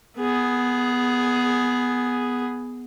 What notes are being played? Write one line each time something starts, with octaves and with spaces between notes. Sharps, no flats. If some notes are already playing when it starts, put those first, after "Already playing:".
B3 G#4